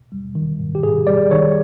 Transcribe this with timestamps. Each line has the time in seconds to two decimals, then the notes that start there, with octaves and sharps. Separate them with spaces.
0.12 G3
0.35 D#3
0.59 G#2
0.75 G4
0.83 G#2 G#4
1.07 G3 D5
1.31 D#3 C#5